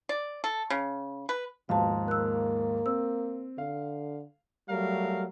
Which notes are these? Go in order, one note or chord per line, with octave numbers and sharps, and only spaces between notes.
D5
A4
C#3
B4
D#2 G#2 B2 F3 F5 A5
A#3 E6 F#6
C4 E6
D3 F5
F#3 G3 A3 A#4 F5